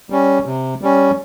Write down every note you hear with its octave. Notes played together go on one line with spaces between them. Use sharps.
G3 C#4
C3
G3 C#4